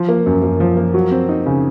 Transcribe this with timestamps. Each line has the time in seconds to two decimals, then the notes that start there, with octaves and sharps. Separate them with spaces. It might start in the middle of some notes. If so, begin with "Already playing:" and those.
Already playing: F3
0.09 A#3
0.26 F#2
0.43 F#2
0.60 F3
0.77 A#3
0.94 F#3
1.11 C4
1.29 D#4
1.46 C#3